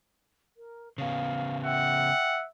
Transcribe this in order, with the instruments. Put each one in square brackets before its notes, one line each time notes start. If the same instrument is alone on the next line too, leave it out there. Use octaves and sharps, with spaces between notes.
[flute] A#4
[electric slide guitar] C#3 B3 [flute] F5
[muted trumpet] E5 [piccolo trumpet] F#5 [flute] G5